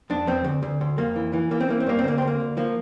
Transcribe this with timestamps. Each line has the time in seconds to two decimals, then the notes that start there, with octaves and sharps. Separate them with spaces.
0.10 F2 D4
0.27 F2 C4
0.44 D2
0.63 D2
0.81 D2
0.98 F2 A#3
1.16 E3
1.33 E3
1.51 E3 A#3
1.60 C4
1.68 E3 A#3
1.80 C4
1.87 G2 A#3
1.99 C4
2.04 D2 A#3
2.18 D2 C4
2.27 A#3
2.40 D2
2.57 F3 A#3